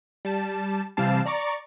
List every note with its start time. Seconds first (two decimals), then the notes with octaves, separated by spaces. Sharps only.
0.25 G3 A5
0.97 C3 E3 G3 C4 F5 A5
1.26 D5 A#5 C#6 A6 D7